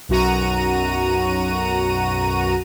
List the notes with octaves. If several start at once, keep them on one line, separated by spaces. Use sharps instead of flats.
B1 F#2 F#4 A#5 D#7